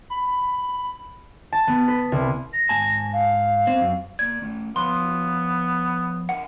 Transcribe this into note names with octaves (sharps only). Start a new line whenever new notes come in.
B5
A5
B3
B4
C2
A#6
G#2 G#5 A5
F5
C4
F#2
A#3 D5 G#6
A3 C#4
F3 B3 C#5 F5 C6
A#4 E5 F#5 G#5